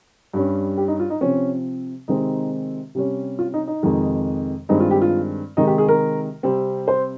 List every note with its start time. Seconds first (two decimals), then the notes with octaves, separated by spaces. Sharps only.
0.33 G2 G3 C#4
0.77 G4
0.88 D#4
1.00 F4
1.10 D#4
1.21 C3 F3 C4 C#4
2.08 C3 D#3 G#3 C4 D#4
2.95 C3 G3 C#4
3.39 F4
3.54 D#4
3.67 D#4
3.83 F2 C3 D#3 G#3
4.69 G2 D#3 G#3 C4 D#4
4.80 F4
4.91 G4
5.02 F4
5.57 C3 D#3 G#3 D#4
5.67 G4
5.78 G#4
5.88 A#4
6.43 C3 G3 C4
6.88 C5